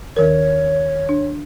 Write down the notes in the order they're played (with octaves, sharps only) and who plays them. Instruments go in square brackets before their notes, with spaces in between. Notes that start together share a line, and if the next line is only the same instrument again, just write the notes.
[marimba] D#2 D#3 A#4 [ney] C#5
[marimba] D4